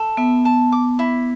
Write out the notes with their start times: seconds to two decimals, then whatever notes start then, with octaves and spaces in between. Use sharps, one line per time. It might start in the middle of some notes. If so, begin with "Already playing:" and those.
Already playing: A4
0.17 B3 E5
0.45 A5
0.72 D6
0.99 E4